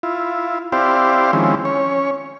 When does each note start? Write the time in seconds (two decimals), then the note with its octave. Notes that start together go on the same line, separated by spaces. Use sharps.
0.03 E4 F4
0.72 C4 E4 G4 C5 D5 F5
1.33 D#3 F3 G#3 C4 C#4 E4
1.65 C#4 C#5